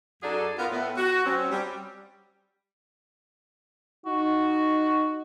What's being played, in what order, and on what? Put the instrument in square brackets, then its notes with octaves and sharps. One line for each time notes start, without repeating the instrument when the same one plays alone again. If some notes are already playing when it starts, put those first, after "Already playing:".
[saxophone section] F#2 D#4 F#4 G#4 A4 D5
B3 F4 A#4
A2 B3
F#4
F#3 C4 C#4
G3
[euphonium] D#4 [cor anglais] F#4